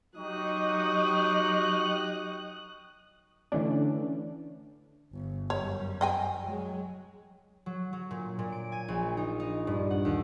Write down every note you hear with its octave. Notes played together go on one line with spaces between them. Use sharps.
F#3 D#4 G4 D#5 C#6 D#6 F#6
D3 E3 A3 C#4 D4
G1
F#2 G3 C#5
D#5 G5 G#5
F#3 G#3
F#3
F#3
A#2
A#2
D7
G#5
A#1
D#4
D#4
G2
F#5
D#2